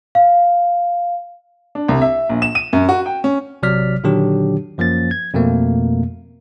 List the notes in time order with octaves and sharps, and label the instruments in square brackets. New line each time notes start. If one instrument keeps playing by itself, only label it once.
[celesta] F5
[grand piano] D4
C2
E5
A#1
E7
D#7
F#2
F#4
G5
C#4
[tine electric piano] A1 C3 F#3 D5 F6 B6
A#2 D3 D#3 F#3 D4 G4
F#2 F3 A#3 C#4 A6
G#6
F2 B2 A3 A#3